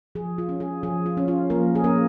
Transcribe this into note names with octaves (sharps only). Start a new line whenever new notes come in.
F3 G#4
F4
C#4
G#4
F3 G#4
F4
C#4
F4
F3 A#3 A#4
G#4
A#3 C#4 A#4